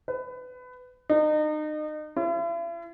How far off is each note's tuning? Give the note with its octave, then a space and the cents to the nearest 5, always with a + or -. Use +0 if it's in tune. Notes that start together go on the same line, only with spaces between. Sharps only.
B4 +25
D#4 -35
E4 +45